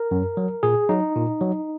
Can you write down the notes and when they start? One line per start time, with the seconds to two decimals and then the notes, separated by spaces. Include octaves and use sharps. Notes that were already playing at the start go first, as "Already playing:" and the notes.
Already playing: A#4
0.11 F#2
0.37 F#3
0.63 A#2 G#4
0.89 F#3 D#4
1.15 A#2
1.41 F#3